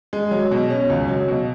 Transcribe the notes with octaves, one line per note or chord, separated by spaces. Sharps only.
G#3
F#3
B2
C#4
C#2
F#3
B2